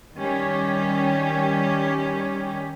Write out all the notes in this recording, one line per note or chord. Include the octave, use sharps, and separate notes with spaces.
D#3 G3 C#4 G4